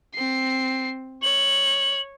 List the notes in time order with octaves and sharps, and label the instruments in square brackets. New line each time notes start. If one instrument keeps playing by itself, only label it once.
[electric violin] C4 C7
[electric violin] C#5 [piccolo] F#7